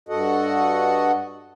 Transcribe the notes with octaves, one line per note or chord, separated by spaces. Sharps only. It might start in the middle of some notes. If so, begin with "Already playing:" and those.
G2 F#4 A4 D#5 F#5